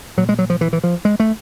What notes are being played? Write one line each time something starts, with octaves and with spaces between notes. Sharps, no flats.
A#2 F#3
G#3
F#3
F3
E3
E3
F3
G#3
A3